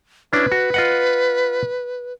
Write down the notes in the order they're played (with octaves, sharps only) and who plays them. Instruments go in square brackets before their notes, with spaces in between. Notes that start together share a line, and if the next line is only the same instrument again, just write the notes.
[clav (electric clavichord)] C#4 D4 E4 [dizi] B4
[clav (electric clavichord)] F#4
F4 D#5 F#5